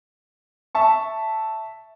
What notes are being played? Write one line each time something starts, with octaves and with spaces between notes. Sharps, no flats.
E5 A5 C#6